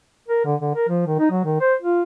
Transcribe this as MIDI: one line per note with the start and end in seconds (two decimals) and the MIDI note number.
0.29 0.41 70
0.45 0.55 50
0.60 0.74 50
0.75 0.89 70
0.89 1.02 53
1.07 1.18 51
1.19 1.28 63
1.31 1.43 54
1.45 1.57 51
1.60 1.74 72
1.82 2.02 65